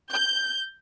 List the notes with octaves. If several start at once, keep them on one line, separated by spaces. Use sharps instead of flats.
G6